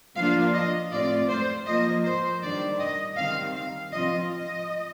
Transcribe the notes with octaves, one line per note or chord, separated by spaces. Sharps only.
F3 A#3 D4 F4 F5
D#5
A2 A3 C4 F4 D5
C5
F3 A#3 F4 D#5
C5
D#3 G3 D4 D5
D#5
D#3 G3 C4 F5
F5
F3 C4 F4 D#5
D#5